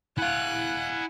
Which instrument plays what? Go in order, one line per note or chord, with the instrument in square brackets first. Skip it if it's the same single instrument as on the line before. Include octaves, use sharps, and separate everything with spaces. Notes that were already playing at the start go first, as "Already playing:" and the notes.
[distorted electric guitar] E4 F5 [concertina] F#5 G#5 [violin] F#6